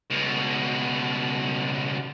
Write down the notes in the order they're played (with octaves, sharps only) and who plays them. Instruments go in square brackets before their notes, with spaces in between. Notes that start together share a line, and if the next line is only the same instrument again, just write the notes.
[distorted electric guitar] C#2 B2